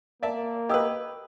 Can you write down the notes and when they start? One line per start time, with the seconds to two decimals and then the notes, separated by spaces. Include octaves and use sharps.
0.23 A#3 D5 E5 A5
0.69 G4 B4 D#5 D#6 E6